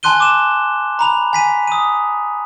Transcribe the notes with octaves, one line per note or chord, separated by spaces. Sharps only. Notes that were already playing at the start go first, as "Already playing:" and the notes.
G#5 A5 C6 F#6 D#7 G7
D6 E7
A#5 B5 F7
G#5 B6 D#7
D#6 D#7